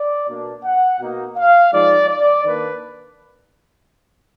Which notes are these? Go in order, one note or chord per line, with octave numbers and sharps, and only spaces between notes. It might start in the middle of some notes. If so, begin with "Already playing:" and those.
Already playing: D5
B2 A#3 D4
F#5
B2 A#3 D#4
F5
F3 G#3 D#4 D5
D5
D#3 A#3 D4 B4